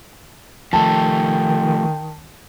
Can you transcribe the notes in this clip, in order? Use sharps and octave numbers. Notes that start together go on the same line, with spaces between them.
D#3 F3 A3 G5 A5